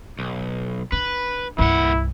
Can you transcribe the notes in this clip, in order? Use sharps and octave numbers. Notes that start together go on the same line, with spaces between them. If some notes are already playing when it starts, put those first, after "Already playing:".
B1
D4 B4
C2 G2 A#2 E4 F#5